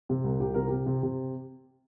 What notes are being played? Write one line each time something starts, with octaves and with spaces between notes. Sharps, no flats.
C3
C2
C2 G4
C3 A#4
C3 G4
C3
C3